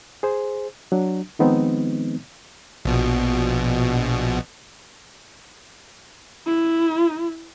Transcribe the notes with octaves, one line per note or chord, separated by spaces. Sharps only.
G#4 C5
F#3 D4
D#3 F3 G#3 B3 C4 D#4
A#1 B2
E4